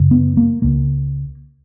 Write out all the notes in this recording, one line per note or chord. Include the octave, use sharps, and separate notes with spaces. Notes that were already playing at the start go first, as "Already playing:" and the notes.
Already playing: F#2 C#3
B3
A#3
C#2 C#3 A#3